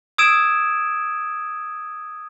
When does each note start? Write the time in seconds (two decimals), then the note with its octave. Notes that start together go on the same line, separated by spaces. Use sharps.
0.18 D#6 E6 G#6 D7 E7